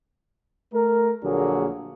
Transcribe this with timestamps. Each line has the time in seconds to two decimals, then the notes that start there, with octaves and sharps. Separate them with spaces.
0.73 A3 A#4
1.23 A#1 D3 F#3 A#3 G#4